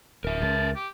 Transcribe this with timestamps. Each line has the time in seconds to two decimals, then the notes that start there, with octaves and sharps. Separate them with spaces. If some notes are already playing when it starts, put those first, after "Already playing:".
0.24 D1 A#4 E5
0.42 C#2 A5
0.76 G4